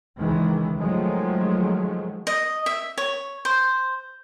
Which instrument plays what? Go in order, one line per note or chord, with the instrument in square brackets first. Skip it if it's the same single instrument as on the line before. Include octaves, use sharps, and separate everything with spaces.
[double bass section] C#2 D#3 E3 G#3
D#3 F3 F#3 G#3 A3
[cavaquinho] D#5
E5
C#5
C5